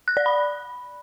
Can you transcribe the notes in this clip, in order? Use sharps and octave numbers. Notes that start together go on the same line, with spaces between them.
F#6
D5
B5